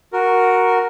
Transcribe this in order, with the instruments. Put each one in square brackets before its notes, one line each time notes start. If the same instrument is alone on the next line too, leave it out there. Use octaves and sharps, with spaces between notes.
[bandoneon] F#4 A#4